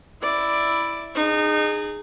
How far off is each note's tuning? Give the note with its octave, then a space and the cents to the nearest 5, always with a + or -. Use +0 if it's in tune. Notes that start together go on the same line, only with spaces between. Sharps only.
E4 +0 D5 +5
D#4 -30 G#4 +0